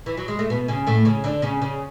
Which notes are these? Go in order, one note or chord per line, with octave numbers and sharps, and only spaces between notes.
E3
F#3
G#3
A3
B2 B3
C#3 C#4
A2 A3
C#3 C#4
D3 D4
C#3 C#4
C#3 C#4